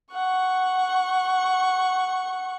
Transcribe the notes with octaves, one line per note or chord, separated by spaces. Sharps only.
F#5 C#6